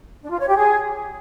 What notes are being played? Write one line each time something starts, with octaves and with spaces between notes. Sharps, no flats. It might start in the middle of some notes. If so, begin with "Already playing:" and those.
D4
F4
C#5
G4
G#4